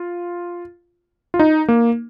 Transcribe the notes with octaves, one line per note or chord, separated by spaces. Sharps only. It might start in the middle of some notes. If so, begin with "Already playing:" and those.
Already playing: F4
F4
D#4
A#3